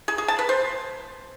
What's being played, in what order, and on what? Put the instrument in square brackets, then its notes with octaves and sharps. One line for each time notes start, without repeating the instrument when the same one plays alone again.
[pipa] G#4
G#4
A5
B4
C5